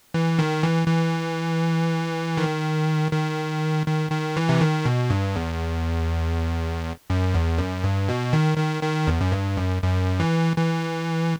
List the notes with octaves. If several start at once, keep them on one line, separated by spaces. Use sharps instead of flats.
E3
D#3
E3
E3
D#3
D#3
D#3
D#3
E3
C3
D#3
B2
G2
E2
F#2
E2
F#2
G2
B2
D#3
D#3
D#3
E2
F#2
G2
F#2
F#2
E3
E3